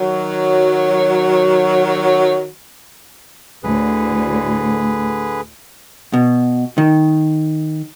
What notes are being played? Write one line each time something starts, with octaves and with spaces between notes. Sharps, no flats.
D#3 F#3
D2 A2 D3 G#4 B4
B2
D#3